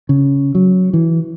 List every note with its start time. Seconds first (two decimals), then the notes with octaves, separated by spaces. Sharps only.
0.09 C#3
0.55 F#3
0.93 E3